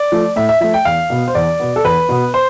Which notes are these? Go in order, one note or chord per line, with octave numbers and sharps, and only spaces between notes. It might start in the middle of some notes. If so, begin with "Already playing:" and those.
Already playing: D5
F3 A3
A2 E5
E5
F3 A3 E5
G5
E2 F5
B2 B3
C5
E2 D5
B2 B3
A4
E2 B4
B2 B3
C5